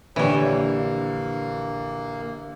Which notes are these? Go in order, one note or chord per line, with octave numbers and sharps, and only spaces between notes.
A#1 D3 E3 G3 C#5
A#3